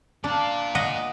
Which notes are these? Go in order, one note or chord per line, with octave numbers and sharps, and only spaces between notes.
A#2 D4 F5
D#5 F#5